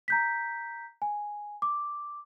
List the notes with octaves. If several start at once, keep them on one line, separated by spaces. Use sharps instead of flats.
A#5 G6 B6
G#5
D6